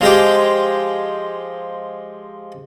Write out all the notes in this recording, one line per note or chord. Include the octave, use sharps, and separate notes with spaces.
F3 G#3 G4